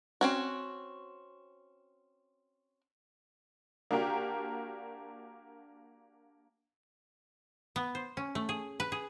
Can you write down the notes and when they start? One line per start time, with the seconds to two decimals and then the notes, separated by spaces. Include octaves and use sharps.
0.21 C4 C#4 F#4
3.91 A#3 D4 F#4 G4 A#4
7.76 B3
7.95 C5
8.17 C#4
8.35 A3
8.49 G#4
8.80 B4
8.92 G#4